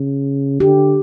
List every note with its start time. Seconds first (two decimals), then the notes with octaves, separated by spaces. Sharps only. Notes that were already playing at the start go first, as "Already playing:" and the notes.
Already playing: C#3
0.60 D3 G4